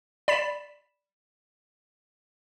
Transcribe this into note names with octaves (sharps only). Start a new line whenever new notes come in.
D5 B5 B6 E7